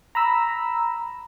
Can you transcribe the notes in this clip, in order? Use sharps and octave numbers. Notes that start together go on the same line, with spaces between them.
A#5 B5 E6